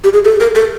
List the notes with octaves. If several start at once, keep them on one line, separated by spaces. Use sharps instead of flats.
G4
G#4
A4
A#4
A4